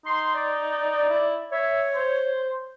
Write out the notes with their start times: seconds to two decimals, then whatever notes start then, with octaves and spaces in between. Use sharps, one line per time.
0.06 D#4 C6
0.35 D5
1.09 E4
1.52 C#5 E5
1.95 C5